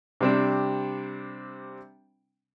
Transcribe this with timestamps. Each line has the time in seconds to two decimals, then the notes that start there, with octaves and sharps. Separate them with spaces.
0.21 C3 G3 C4 D4